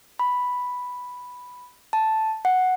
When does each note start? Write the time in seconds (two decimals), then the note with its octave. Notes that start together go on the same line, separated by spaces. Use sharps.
0.19 B5
1.93 A5
2.45 F#5